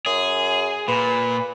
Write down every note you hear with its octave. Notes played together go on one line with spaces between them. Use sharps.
F#2 G#4
A#2 B4